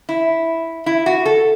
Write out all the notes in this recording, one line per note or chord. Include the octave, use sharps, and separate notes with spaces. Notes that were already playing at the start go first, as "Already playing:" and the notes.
E4
E4
F#4
A4